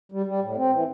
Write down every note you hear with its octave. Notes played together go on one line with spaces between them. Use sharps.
G3
G3
A2
C4
E3